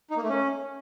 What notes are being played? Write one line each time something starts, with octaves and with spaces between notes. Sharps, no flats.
D#4
A#3
A3
C#4